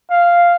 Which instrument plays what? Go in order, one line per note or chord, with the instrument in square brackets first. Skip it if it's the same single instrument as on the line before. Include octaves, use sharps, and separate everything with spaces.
[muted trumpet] F5